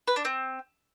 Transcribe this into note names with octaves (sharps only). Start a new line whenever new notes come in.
B4
D4
C4